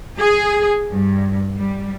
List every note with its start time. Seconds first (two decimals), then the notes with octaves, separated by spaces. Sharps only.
0.20 G#4
0.92 G2
1.57 G3